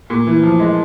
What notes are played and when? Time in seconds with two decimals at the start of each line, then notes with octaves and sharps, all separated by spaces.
0.10 A#2
0.27 E3
0.43 F3
0.60 G#3